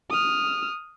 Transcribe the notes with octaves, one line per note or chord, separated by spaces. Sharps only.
D#6 F6